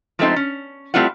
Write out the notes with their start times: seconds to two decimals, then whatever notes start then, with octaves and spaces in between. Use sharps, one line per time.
0.19 F3 G#3 A3 B3 C4 D#4
0.36 C#4
0.94 G3 A3 C4 E4 F4 F#5